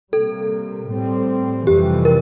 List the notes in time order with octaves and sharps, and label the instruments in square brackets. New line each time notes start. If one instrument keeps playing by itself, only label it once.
[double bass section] C3 G3 A#3 [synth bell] A4
[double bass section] A2 G3 C4
[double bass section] F2 C3 E3 G3 [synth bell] G4
[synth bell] A#4